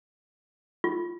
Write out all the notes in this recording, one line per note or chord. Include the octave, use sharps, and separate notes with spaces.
F4